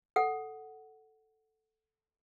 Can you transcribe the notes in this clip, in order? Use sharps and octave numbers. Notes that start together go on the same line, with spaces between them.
A4 F#5